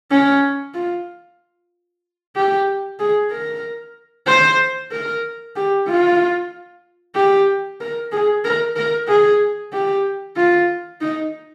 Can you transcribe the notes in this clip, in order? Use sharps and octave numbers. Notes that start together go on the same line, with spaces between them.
C#4
F4
G4
G#4
A#4
C5
A#4
G4
F4
G4
A#4
G#4
A#4
A#4
G#4
G4
F4
D#4